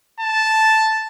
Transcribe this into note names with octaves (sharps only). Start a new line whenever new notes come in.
A5